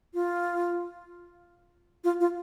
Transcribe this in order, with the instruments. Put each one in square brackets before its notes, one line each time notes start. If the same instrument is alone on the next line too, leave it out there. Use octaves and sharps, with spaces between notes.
[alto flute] F4
F4
F4